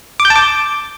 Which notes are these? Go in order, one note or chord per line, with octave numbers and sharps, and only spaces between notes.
D6
G6
A5
D6